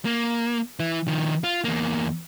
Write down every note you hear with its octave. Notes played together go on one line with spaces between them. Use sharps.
A#3
E3 E4
D#3 F3
F4
E2 A#3